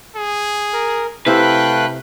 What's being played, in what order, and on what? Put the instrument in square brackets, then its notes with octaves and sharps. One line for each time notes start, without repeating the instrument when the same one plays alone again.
[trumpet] G#4
[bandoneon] A#4
[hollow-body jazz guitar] C3 E4 C5 [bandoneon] A3 F5 F#6 [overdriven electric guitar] B4 [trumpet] G5